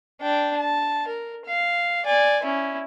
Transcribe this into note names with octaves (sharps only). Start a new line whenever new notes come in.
D4 G5
A5
A#4
F5
D5 G#5
C#4 E4